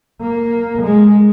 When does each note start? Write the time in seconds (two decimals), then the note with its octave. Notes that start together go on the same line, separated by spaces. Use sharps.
0.21 A#3
0.82 G#3